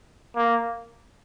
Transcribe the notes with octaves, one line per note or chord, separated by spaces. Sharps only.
A#3